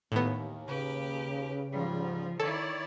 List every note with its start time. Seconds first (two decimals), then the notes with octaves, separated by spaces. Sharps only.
0.12 D#2 A2 D#3 B3
0.67 C#3 G4 B4
1.72 G#2 F3 G3
2.40 D#3 E4 A4 C#5 D5